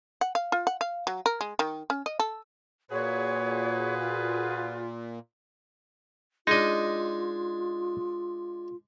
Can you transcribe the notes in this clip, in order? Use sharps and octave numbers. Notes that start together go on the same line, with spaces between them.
F#5
F5
F4
F#5
F5
F#3
A#4
G#3
D#3
C#4
D#5
A4
A#2 F#4 G#4 B4 C#5
F4
G#3 D4 D#4 F4 D#5